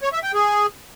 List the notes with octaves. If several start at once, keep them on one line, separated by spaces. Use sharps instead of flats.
C#5
E5
G5
G#4